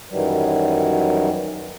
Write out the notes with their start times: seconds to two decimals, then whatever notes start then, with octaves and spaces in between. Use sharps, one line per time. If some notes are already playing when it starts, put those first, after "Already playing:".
0.11 F#2 D#3 E3 F#3 G3